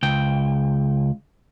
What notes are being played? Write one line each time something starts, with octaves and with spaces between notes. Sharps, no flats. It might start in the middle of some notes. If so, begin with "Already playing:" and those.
C#2 G5